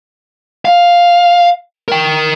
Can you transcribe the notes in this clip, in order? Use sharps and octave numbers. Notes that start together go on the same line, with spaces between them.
F5
A#4 G5